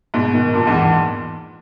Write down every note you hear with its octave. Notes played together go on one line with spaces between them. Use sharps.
G#2 B2
B2 D#3
G2 A#2
E2 G#2
E2